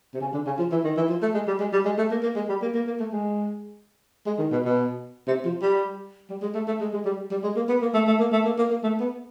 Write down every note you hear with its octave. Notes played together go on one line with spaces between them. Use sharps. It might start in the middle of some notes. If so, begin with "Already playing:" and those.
C3
C#3
D3
C#3
F3
E3
D#3
E3
F3
A3
G#3
G3
G#3
G3
G#3
A3
A#3
A#3
G#3
G3
A#3
A#3
A#3
A3
G#3
G#3
D#3
B2
B2
C3
F3
G3
G3
G#3
A3
A3
G#3
G#3
G3
G3
G#3
A#3
B3
A#3
A3
A3
A#3
A3
A#3
A#3
A#3
A3
B3